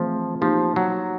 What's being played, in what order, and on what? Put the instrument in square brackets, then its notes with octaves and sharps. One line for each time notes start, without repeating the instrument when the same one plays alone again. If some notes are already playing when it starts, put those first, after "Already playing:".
Already playing: [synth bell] E3 A3 C4 F4 G#4 [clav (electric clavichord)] F3
[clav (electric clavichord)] F3 [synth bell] A#3 D#4 G4 C5
[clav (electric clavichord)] F#3